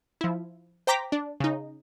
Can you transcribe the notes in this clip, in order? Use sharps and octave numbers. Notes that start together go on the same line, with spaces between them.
F3 E4
C5 G5 A#5 D6 A#6 B6
D4
C#3 D#4